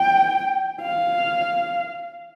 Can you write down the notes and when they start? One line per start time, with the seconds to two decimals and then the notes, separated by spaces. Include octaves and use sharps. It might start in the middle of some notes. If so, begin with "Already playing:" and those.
Already playing: G5
0.83 F5